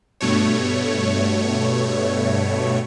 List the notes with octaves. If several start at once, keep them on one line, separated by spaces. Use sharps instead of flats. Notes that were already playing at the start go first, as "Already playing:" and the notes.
G2 B2 A3 C#5